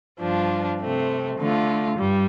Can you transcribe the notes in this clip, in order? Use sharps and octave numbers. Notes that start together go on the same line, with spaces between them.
G2 F3 D4 F4
C3 A3 C4
D3 A3 F4
G2 G3